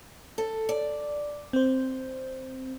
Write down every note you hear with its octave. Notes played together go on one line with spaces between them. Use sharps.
A4
D5
C4 C5